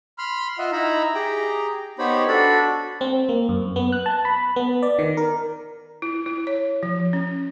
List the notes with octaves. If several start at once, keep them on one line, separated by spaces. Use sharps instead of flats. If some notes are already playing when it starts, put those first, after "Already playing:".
B5 C6 F6
F4 D#5 E5 F#5
D#4 E4 E5 A#5 B5
G4 G#4 G5 A#5
B3 D#4 G4 C5 C#5 B5
D4 F#4 A4 D5 B5
C4
A#3
F#2
B3
F#6
A5
B5
B3
D5
D#3
A#4
E4
E4
C#5
F3
C#4